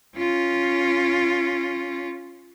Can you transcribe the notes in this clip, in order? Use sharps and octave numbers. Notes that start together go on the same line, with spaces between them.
C#4 F4